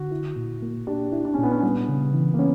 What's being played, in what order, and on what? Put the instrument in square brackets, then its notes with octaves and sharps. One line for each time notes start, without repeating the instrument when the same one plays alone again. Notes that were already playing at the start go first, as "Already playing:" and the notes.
Already playing: [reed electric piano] D3 [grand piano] F#4
[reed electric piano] E4
A#2
A#3
[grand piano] D4 [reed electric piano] G4
[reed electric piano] E4
[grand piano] D4
C#4
[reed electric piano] A#2
[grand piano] B3
C#4
[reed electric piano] G3 [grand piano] B3
[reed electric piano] C#3
E3
[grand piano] A#3
[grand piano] B3 [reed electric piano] C#4